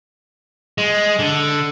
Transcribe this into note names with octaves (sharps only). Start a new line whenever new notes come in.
G#3
D3